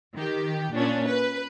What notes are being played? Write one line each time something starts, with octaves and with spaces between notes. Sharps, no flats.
D#3 G4
A#2 C#4 D4
B4